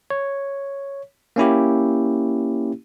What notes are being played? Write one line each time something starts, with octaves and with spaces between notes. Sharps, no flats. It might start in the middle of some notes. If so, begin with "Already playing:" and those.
C#5
A#3 C#4 E4 G4